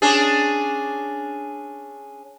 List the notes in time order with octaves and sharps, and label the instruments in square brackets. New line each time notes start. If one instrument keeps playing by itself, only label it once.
[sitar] C#4 D4 G#4